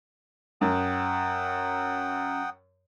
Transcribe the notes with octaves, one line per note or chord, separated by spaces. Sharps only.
F#2 F#5 G5 D#6